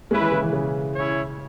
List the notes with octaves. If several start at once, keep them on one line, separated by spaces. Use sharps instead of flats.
G#3 C#4 E4 B4
E3
C#3
E3
C#3
C#4 E4 C#5